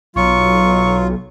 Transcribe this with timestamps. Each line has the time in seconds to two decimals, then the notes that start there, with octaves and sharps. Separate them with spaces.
0.16 B1 F#3 F4 C#6